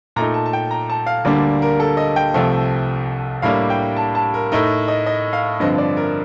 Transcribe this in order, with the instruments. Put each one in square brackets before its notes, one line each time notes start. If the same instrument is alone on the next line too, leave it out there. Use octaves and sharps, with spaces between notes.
[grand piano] A#2 A3 D#4 A#5
A5
A5
G5
A#5
A5
F5
D2 D3 G3 A#3 D4 D5
A#4
A4
D#5
G5
C2 C3 F3 A3
A2 G3 A#3 D4 F5
G5
A5
A5
A#4
A2 A3 D#4 A#4
D#5
D#5
F5
G2 D3 F3 C4 D#5
D5
A#4